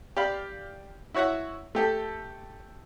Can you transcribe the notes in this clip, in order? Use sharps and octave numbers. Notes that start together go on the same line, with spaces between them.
G4 D5 F5 B5
E4 F#4 C#5 E5 F#5
A3 G4 A4